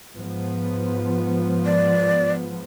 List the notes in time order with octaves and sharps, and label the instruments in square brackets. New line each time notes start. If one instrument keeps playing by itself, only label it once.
[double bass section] G#2 F3 B3
[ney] D5